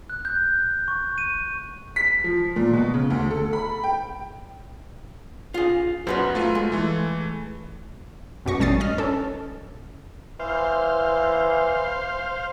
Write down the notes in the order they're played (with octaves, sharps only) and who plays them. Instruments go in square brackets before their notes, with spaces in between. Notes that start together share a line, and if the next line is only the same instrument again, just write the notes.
[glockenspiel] F#6
G6
C#6
D#7
[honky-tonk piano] B6
F3
A#2
B2
C#3
D2
A4
B5
G5
[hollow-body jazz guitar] F4 G#4
[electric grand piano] F#2 [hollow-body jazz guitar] F#4 B4 C5
[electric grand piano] A3 F4
[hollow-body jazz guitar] G#3
[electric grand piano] E3 A3
[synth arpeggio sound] B1 F#2 B2 C#6 A#6
A1 G3 C#4 D#6 A6 C7
D#5 F6
C#4 A4
[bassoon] E3 [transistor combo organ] C5 F5